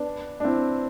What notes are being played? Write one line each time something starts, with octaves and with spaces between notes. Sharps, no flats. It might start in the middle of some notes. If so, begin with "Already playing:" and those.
Already playing: B3 D4
D4
C4 E4